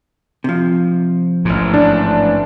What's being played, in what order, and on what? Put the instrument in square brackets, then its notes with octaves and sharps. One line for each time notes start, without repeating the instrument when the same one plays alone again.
[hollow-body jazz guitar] C3 F3
[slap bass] A1 G#2
[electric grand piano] D4